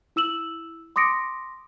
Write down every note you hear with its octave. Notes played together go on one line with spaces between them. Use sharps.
E4 E6 E7 F#7
C6 D6 D#6 A#6 C#7 D7